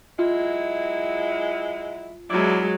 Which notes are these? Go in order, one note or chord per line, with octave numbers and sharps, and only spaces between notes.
F#3 G#3 E4 F4
E2 F#3 G#3 E4 D5